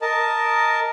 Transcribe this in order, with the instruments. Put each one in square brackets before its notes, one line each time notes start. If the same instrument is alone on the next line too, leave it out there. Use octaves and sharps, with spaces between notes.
[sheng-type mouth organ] A#4 D#5 A5